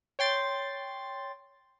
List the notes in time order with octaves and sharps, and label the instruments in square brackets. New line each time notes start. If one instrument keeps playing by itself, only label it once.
[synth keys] C#5 G5 C6 A6